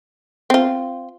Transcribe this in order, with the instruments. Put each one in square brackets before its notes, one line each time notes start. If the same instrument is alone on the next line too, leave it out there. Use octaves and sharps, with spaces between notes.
[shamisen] C4 F4